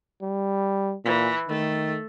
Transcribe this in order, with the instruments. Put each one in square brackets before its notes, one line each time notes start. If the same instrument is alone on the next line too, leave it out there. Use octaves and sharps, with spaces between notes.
[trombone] G3
[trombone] A#2 [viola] E3
[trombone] D#3 [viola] A3 A4